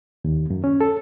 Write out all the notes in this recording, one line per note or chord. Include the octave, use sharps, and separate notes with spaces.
D#2
F#2
C#4
A4